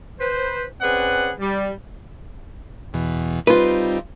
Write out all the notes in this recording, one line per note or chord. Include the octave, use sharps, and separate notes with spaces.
B4 C5
C4 C#4 G#4 B4 D5 F#5
G3
E2 B2 E3
G3 C4 D#4 F4 B4